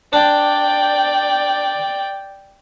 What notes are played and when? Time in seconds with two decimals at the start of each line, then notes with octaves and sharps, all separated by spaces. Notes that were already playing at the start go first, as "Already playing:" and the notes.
0.13 D4 D5 G5